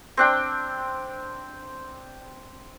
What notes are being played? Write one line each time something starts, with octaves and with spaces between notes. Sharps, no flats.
C4 D4 G5